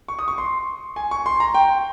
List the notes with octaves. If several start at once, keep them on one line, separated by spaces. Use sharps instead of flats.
C#6
D#6
C#6
C6
G#5
C#6
C6
A#5
G5